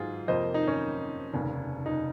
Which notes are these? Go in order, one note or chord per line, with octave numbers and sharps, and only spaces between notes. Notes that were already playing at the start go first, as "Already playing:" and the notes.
Already playing: G#2 F#3 F4 G#4
F2 C3 F3 A#3 C5 D#5
D#4
C#4
F1 D#2 C#3
D#4